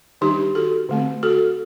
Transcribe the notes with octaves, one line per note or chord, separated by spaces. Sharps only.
D#3 G3 D4 D#4 G4
F#4 A4
D3 A3 C4
F#4 A4